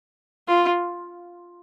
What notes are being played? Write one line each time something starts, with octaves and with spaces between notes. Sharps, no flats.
F4